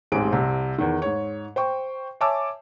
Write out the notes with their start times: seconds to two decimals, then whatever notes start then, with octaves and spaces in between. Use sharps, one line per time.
0.12 D#1 A1 G#2 C4 G#4 D7
0.32 C2 C3
0.79 E2 D#3
1.02 G#2 C#5
1.56 C5 G5 C#6
2.21 C#5 E5 G#5 A5 D6 E6